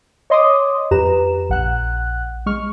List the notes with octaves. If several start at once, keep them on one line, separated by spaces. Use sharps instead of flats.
C#5 D#5 C6 D6 D#6
F2 G4 B4 A#5 E7
A#1 F#5 F#6
G#3 C#6 F6